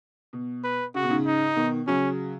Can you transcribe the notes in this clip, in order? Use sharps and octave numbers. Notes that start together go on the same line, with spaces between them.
B2
B4
C#3 F#4
B2
G#2 C#3
D#4
B2 D#3
C#3 F#3 C#4